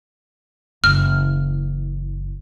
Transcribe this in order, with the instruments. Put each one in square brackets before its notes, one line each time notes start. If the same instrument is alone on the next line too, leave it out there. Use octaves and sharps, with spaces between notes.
[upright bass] F#1 E3 [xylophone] F6